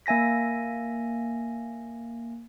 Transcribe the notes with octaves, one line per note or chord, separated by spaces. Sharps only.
A#3 E5 G#5 A#6 B6